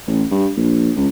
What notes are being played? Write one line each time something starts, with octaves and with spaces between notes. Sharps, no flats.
A1
G2
A#1
C#2